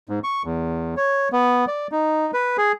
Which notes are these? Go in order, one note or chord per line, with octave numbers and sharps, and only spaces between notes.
G#2
C#6
E2
C#5
B3
D5
D#4
B4
G#4